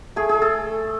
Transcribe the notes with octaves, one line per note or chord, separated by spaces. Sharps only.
A3 G#4
G#4
A3
A4